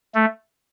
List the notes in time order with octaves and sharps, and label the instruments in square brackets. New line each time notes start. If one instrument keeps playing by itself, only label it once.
[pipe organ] A3